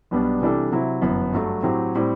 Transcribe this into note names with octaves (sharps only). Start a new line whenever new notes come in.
B1 B2 G3 B3 D4
C3 E3 G3 D4 A4
C3 F#3 C4 E4
G1 F#2 E3 B3
G2 F#3 A3
A2 F#3 C4 G4
A2 G3 C4